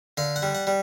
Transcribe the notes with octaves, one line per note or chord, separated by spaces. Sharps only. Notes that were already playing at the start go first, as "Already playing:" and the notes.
D3 F5
F#5
G3
F#5
G3